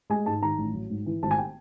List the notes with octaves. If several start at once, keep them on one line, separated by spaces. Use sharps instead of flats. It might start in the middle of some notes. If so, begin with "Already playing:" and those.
G#3 G#5
G#2 A5
D#3 A#5
A1
F#3
G#2
E3
G#1 A5
G#5
G5